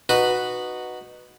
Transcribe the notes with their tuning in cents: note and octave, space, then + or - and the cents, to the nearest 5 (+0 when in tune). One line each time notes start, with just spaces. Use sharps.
D#4 -15 F#4 -5 B4 +0